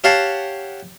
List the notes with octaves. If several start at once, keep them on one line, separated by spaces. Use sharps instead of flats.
G4 C#5 F5 F#5 A5